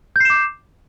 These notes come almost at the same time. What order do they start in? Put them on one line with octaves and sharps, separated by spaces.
G6 C7 E7 D6